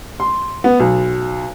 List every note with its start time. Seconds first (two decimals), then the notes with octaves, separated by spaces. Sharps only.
0.20 C6
0.64 B3
0.80 B1